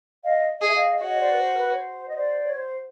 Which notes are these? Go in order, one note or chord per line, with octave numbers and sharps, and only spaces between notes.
D#5 F5
D#5
G#4
E5
D#5 F5
F#4 C#5 D#5
C5 D5
B4
C5
A#4
B4
C#5
C5
D#5
C5 D5
C#5
C5